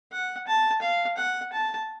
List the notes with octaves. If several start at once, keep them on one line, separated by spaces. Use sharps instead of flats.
F#5
A5
F5
F#5
A5